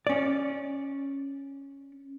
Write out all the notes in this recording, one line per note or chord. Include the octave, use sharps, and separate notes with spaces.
C#4 D5